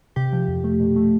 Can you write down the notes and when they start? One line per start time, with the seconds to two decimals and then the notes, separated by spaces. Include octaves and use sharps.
0.16 C3 G4
0.33 F3
0.48 F2
0.64 A3
0.80 B2
0.96 A3